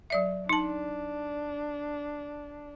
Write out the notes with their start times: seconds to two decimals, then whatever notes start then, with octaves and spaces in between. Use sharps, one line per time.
0.10 F#3 D5 E5
0.49 D4 D#4 A5